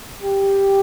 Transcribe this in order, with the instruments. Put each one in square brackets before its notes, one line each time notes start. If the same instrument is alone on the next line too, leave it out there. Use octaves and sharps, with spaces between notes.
[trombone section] G4